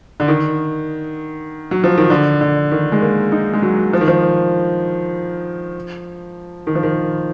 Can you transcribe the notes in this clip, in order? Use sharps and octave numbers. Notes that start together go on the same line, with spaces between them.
D3
D#3
F#3
F3
D#3
D3
D3
D#3
G#3
A#3
D#4
G#3
F#3
F3
D#3
F3
D#3
F3
D#3